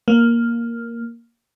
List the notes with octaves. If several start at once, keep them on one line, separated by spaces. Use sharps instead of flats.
A#3